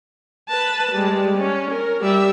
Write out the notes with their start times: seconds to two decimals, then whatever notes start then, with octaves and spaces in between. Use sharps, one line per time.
0.49 B4 A5
0.92 G3 G#3
1.38 C#4
1.71 A#4
2.01 G3 E5